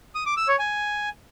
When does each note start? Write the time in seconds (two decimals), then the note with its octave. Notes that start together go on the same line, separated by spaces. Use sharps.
0.15 D#6
0.26 D6
0.37 E6
0.48 C#5
0.59 G#5